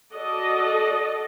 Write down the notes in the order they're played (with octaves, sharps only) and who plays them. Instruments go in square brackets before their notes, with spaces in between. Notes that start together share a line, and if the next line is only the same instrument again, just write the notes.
[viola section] F#4 A4 D5 D#5